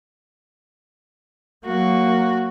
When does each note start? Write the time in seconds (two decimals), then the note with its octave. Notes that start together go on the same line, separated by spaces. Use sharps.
1.66 F#3 A#3 F#4